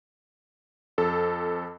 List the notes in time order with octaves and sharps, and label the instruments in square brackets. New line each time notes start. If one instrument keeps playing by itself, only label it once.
[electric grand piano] F2 A4